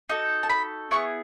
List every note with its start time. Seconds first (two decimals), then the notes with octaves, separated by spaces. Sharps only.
0.09 D#4 F#4 A4
0.43 A5
0.50 B5
0.91 B3 E4 G#4 C#6